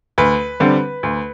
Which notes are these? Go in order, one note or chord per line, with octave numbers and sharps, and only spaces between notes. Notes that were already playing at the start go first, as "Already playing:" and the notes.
D2 B4
D3 G3 C4
D2